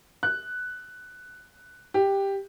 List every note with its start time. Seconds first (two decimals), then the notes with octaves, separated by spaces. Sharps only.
0.23 F#6
1.94 G4